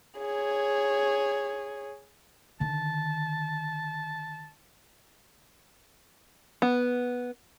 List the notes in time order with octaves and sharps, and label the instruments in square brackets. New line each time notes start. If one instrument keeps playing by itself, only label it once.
[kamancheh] G#4 C#5
[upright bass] D3 D#3 [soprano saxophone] A5
[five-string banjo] B3